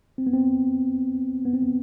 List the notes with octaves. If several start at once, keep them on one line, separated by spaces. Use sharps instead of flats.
C4
B3
C4
B3
C4
B3